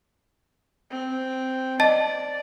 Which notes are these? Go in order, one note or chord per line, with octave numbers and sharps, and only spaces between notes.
C4
D5 D#5 A5 A6